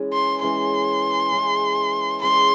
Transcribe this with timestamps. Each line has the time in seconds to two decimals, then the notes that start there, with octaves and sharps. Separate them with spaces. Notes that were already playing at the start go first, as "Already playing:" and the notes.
Already playing: E3 G#3 C#4
0.13 C6
0.42 E3 G#3 C#4 C6
1.32 E3 G#3 C#4
2.22 E3 G#3 C#4 C6